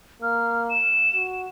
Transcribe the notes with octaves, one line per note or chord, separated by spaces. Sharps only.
A#3 F6
E7
F#4